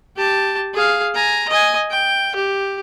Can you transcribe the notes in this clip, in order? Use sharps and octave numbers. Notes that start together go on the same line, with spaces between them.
G4 A5
G#4 F5
G#5 A#5
D#5 G#5
G5
G4